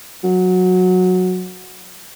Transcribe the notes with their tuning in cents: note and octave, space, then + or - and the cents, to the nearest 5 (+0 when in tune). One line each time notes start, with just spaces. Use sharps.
F#3 -15